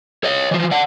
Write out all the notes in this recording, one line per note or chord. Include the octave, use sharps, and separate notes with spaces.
C#5 D#5
E3 F3
D5 F#5